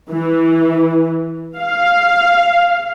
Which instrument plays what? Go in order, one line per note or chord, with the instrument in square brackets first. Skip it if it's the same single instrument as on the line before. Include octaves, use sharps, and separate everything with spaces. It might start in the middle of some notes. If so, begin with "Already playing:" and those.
[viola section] E3
F5